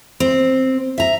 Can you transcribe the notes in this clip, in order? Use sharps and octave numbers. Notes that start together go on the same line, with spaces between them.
C4
E5 A#5